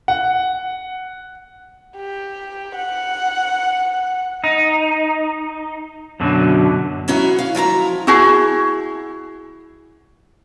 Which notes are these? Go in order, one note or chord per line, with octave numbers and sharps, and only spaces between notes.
F#5
G4
F#5
D#4
F#2 B2 D3 F#3
F#3 G#3 C#4 E4 F#4
F5
F3 F#3 E4 A#5
E4 F#4 G#4